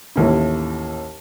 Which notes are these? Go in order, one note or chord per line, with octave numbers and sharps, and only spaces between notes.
A1 D#2 E4